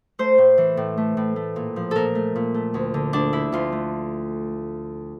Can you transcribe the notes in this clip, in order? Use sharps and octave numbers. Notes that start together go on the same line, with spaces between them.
A3 C5
A2
E3
A2
A3
A2
A3
A#2
F3
A#2 A4 A#4
A3
A#2
A3
D2
D3
D2 D4
A3 E4
D2 F4
A3